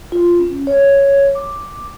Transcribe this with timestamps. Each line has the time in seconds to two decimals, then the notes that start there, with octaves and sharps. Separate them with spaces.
0.12 F4
0.39 C#4
0.67 C#5
1.35 D6